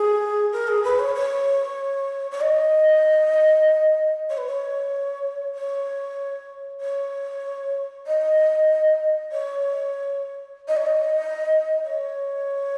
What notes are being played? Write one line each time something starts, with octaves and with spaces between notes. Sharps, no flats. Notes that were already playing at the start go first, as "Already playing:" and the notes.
Already playing: G#4
A#4
G#4
B4
C#5
C#5
C#5
D#5
C#5
B4
C#5
C#5
C#5
D#5
C#5
D#5
C#5
D#5
C#5